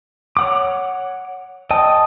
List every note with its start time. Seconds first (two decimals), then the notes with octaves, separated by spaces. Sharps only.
0.37 C#5 F#5 D6
1.71 D#5 G5 A5 D#6